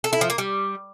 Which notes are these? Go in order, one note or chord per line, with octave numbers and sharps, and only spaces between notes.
A4
E4
F3
A#3
G3